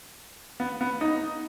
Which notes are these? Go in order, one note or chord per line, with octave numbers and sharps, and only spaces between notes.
B3
B3
D#4